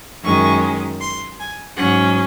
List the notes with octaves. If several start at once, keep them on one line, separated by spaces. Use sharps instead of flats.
F#2 D#3 G#3 C#4 C#6
C6
G#5
G#2 F#3 C#4 F#5